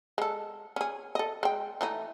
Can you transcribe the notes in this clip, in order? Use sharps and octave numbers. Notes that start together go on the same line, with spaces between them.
G#3 A4
C#4 G#4
A4 D#5
G#3 G5
E3 A3 D#4